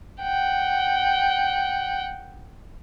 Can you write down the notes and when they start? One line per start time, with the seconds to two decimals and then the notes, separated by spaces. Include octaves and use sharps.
0.23 F#5 G5